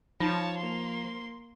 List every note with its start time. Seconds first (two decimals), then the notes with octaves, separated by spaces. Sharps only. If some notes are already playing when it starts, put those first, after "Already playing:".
0.20 F3 D#4 C#5 A5
0.57 A#3 C6